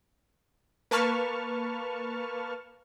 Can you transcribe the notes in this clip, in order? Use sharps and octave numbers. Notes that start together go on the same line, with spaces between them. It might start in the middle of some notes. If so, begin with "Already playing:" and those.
A#3 B4 A5 C#6 F6